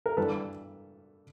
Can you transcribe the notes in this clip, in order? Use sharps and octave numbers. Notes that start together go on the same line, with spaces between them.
A#4
G2 E3 G3 A4 B4